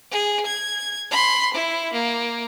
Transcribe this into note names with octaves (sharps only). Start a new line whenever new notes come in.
G#4
G#6
B5 C6
E4
A#3